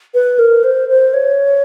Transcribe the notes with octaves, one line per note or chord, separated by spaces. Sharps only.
B4
A#4
C5
C5
C#5